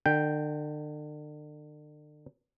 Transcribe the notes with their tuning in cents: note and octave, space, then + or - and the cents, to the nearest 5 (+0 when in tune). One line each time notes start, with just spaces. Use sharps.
D3 +40 G5 +0